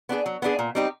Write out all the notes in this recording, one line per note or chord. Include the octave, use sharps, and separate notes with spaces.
B3 D4 F4 G#4
F#3
B3 D4 F4 G#4
A#2
G3 C4 D#4 G4